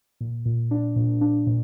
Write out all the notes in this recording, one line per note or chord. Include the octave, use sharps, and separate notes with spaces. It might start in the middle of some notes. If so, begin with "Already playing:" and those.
A#2
A#2
D4
A#2
D4
A#2